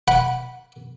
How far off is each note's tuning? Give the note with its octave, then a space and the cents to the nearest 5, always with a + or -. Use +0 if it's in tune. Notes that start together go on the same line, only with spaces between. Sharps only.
F#5 +0 B5 +0